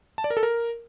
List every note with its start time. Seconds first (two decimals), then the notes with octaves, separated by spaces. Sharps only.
0.18 A5
0.24 D5
0.30 A#4
0.37 A4
0.43 A#4